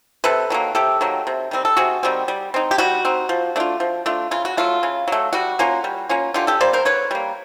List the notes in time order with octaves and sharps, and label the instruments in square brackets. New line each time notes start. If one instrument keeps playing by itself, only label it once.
[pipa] C3 A4 B4
D#3 F#3 A#3
C3 G4 A4
D#3 F#3 A#3
C3
D#3 G3 C4
A4
C3 F#4 G#4
D#3 G3 C4
G3
C4 D#4
G4
G3 F#4
C4 D#4
F3
A3 D4 F4
F3
A3 D4 F4
C#3 F4
F#4
F#3 A3 F4
C#3
F#3 A3
G3 F#4
A#3 C#4 F4
G3
A#3 C#4 F4
D3 F4 G4
G4 A4
G3 A#3 C5 D5
A#4 C5
D3 B4 C#5
G3 A#3